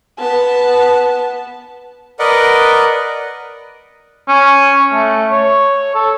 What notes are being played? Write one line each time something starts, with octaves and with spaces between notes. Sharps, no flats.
B3 A5
A#4 B4 D5 D#5 F#5
C#4
A3
C#5
A4